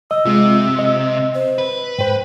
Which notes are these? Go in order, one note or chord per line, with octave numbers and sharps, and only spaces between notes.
D#5 E6
C3 G#3 F4
D#5
C5
B4
G#2 C5 G5